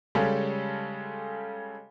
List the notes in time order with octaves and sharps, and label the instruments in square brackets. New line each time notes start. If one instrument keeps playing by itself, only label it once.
[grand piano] C#3 G3 G#3 C#4 A4